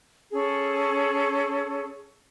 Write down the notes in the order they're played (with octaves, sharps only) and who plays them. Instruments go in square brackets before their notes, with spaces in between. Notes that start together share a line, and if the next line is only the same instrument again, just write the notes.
[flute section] C#4 G#4 A4